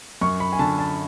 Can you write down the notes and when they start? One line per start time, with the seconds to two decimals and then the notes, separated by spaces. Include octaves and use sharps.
0.21 F#2 C#6
0.40 B5
0.53 G#5
0.59 D3 A5
0.79 A5